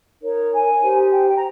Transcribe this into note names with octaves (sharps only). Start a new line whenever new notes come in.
D#4 A#4 C#5
G#5
D#4 G4 C5
G5
G5
A#5